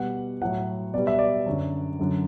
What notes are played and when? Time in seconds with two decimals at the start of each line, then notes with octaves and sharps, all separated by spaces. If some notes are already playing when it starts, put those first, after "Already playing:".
Already playing: B2 G3 F#5
0.41 A2 F#3 F#5
0.94 B2 G3 D5
1.07 E5
1.19 D5
1.46 F#2 D3 F#3
1.99 F#2 D3 F#3